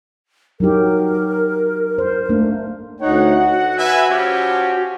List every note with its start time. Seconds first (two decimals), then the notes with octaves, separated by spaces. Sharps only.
0.60 F#3 D#4 G4 A#4
1.98 C5
2.29 A3 A#3 D4
3.01 D2 D#4 C#5 F#5
3.39 F#4
3.78 B4 E5 G#5
4.09 F3 C#4 G4